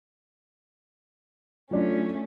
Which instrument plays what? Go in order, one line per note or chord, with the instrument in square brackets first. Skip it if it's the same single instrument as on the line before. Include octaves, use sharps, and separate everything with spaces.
[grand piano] F#3 D4 F4 [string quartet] A3 C#4